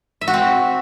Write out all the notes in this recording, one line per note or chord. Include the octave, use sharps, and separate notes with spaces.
E5
F#4
C4